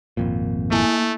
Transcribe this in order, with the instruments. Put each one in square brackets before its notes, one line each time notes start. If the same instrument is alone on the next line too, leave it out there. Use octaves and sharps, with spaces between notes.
[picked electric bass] G#1 F2 A#2
[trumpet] A3 [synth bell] A#3 E4 G#5